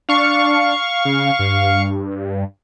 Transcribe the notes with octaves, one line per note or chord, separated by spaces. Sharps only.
D4 F5 C#6
C#3
G2